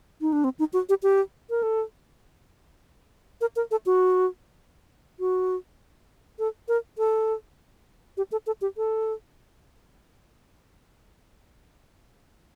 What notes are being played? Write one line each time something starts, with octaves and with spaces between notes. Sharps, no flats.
D#4
D4
C4
D#4
F#4
G4
G4
A#4
A4
A#4
A#4
A4
F#4
F#4
A4
A#4
A4
G4
A4
A4
G4
A4